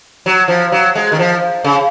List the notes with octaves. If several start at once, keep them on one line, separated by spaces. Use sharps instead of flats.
F#3
F3
F#3
G#3
D#3
F3
C#3